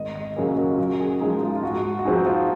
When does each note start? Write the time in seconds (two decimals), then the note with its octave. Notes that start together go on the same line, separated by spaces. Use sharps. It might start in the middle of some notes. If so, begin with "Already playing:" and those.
Already playing: G#1 D#5
0.15 D#5
0.36 F#2 C#3 F#3 A#3 G#4
0.58 F#4
0.71 F4
0.78 F#2 F#4
1.00 G#4
1.20 F3 G#3 D#4 G#4
1.42 F4
1.56 F4
1.63 G#2 F#4
1.84 F#4
1.99 F#4
2.05 F3 C4 D#4 G#4
2.27 F4